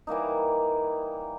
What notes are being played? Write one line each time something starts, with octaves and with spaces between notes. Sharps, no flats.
E3 G3 A#3 D#4